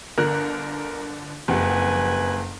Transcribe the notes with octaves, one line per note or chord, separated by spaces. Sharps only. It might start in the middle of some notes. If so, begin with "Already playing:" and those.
G1 D3 A#4 F#6
F#1 F2 G4 B4 F#5 G#5